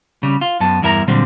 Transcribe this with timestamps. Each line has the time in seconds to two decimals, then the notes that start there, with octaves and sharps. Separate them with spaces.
0.23 C#3 G3
0.41 F4
0.60 F#2 B3 A5
0.82 E2 G2 E4 A#4 G#5 A#5
1.08 A#2 D3 F#3 G3 C4